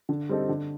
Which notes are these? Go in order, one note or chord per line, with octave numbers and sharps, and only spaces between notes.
D3
G3 C4 D#4 A4
D3